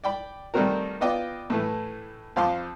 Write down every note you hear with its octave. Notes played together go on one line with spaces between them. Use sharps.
D5 G5 B5
D#3 G3 A3 C4 F#4 A#4
B3 F4 D5 D#5 G5 D6
A2 E3 A3
F2 C5 F5 A5 C6 D6